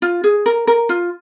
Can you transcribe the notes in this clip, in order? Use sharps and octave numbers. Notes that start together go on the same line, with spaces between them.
F4
G#4
A#4
A#4
F4